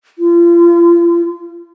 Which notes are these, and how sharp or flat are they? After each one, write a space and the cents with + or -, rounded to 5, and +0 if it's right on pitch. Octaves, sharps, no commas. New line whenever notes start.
F4 -35